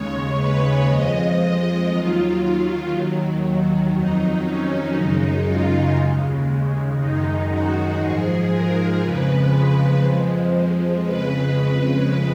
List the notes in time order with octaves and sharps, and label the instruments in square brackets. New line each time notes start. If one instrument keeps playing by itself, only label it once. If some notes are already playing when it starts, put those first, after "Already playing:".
Already playing: [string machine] D#2 C#3 G#3 C#5
B4
F2 F3 G#3 D#5
D#2 D#3 F#3 F4
D#2 D#3 F#3
F2 D#3 F#3 D#4
C#4
F#2 C#3 G#3 D#4
F4
D#2 C#3 G#3
F#2 D#3 G#3 D#4
F#4
G#2 F3 G#3 G#4
A#4
F2 C#3 F3 G#3 B4
F2 F3 G#3
F2 C#3 G#3 B4